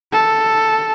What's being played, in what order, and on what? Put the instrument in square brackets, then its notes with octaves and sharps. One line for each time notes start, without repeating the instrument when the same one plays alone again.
[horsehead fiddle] A4